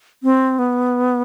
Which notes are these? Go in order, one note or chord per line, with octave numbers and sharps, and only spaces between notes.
C4
B3